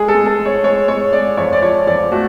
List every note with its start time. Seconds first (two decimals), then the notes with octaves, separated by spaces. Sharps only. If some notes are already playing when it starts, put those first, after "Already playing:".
Already playing: G#3 G#4
0.08 A4
0.15 G#3
0.26 A4
0.39 G#3
0.46 C#5
0.64 G#3 C#5
0.88 G#3 C#5
1.13 G#3 D5
1.37 F2 C#5
1.53 D5
1.62 F3 C#5
1.87 F2 D5
2.12 A3 F#4